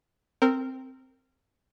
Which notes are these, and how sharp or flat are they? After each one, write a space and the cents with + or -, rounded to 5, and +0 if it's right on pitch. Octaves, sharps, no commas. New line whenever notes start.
C4 +0 A#4 -20